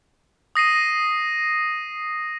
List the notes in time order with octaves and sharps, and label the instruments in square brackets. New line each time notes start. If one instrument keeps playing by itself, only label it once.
[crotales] D#6 A#6 C7 D#7